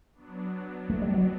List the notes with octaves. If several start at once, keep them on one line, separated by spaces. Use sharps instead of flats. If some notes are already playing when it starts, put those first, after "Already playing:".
F#3 B3 D4
A3
G3
F#3